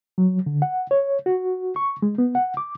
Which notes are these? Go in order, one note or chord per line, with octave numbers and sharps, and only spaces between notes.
F#3
D3
F#5
C#5
F#4
C#6
G#3
B3
F#5
D6